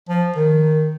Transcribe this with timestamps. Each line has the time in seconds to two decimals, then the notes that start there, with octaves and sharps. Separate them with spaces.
0.09 F3
0.36 D#3